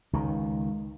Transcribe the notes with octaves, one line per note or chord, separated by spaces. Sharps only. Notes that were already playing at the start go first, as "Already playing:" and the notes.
C#2 D#3